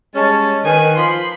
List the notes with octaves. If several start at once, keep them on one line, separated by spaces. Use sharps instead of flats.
G3 G#3 C#4 A5
D#3 B4 G#5
F3 B5 C6